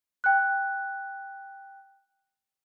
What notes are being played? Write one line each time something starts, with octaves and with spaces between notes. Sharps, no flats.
G5 F#6